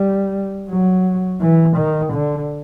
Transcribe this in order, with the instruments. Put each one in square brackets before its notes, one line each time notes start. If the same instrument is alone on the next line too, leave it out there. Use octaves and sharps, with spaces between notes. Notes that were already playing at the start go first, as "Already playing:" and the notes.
Already playing: [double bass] G3
F#3
E3
D#3
D3